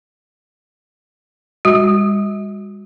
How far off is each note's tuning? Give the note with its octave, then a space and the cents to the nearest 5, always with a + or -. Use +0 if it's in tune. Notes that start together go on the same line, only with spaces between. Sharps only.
G#3 -45 F#4 -15